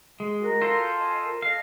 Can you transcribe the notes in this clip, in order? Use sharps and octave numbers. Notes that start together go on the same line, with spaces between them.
G#3
F#4 A#4
F4 A4 C5
D#5 G#5 A5
A#4
A4 D#5 F5